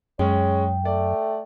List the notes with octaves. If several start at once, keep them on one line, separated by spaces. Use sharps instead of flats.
F#2 G#3 C#4 C#5 G5
A3 D5